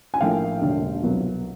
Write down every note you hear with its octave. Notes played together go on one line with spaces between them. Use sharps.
G#5
A#1 A2 F3 A#3 F5 G5
E1 D#2 D3
C2 B2 F#3 B3